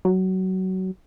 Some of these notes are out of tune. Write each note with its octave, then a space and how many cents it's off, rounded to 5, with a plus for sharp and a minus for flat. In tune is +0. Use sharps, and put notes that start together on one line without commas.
F#3 +20